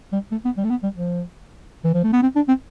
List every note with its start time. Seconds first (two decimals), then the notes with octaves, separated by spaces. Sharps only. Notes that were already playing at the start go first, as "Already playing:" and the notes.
0.12 G3
0.31 A3
0.45 B3
0.57 G3
0.64 A3
0.70 B3
0.83 G3
0.95 F3
1.84 E3
1.94 F3
2.04 A3
2.13 B3
2.22 C4
2.36 D4
2.48 C4